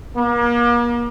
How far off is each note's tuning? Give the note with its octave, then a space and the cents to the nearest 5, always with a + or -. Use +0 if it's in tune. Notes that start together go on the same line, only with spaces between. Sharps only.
A#3 +40